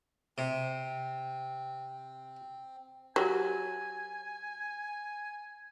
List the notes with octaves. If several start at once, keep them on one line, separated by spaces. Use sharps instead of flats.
C3 C4
F#3 F#4 G4 G#5